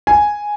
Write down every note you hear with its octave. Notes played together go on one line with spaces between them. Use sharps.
G#5